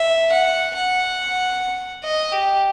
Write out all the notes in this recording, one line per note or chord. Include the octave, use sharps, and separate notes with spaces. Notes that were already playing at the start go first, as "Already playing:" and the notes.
Already playing: E5
F#5
F#5
D#5
G4